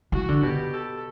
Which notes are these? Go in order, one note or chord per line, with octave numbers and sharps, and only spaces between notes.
E3 F#4
D3
B2 G4
A4